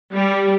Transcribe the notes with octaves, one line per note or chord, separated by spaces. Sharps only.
G3